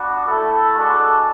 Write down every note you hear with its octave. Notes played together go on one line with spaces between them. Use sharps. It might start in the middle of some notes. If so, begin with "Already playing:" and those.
Already playing: B3 D4 F#4
A3 E4 A4
G#3 D4 F#4 A4